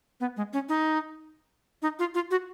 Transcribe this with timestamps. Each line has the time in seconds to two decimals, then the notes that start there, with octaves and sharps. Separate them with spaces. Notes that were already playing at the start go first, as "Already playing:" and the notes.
0.20 B3
0.37 G#3
0.53 C#4
0.69 D#4
1.82 D#4
1.99 F4
2.14 F4
2.31 F#4